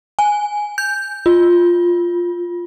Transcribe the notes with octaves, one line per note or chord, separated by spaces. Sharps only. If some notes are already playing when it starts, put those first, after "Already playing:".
G#5
G6
F4